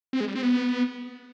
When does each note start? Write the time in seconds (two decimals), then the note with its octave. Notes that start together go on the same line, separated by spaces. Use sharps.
0.13 C4
0.20 G#3
0.28 G3
0.35 C4
0.43 B3